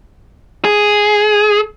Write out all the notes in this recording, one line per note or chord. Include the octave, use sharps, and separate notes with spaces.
G#4